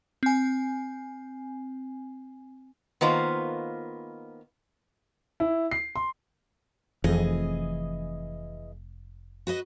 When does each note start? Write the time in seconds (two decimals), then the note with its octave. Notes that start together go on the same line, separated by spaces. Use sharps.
0.23 C4 G#5
3.01 D#3 A#3 B3 F4 C5
5.40 E4
5.71 C7
5.96 C6
7.04 F1 F2 E3 G#4 D#5
9.47 F#4 B4 D#5